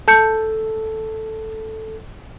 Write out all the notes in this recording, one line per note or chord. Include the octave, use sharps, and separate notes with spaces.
A4 A5 G6 C#7